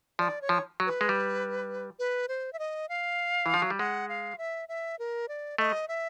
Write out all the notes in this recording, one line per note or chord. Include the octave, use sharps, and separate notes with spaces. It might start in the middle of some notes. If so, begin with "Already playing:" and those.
F3 D5
C#5
F3
F#3
B4
G#3
G3
B4
C5
E5
D#5
F5
E3
F3
F#3
G3
G#3 F#5
F5
E5
E5
A#4
D5
A3 D#5
E5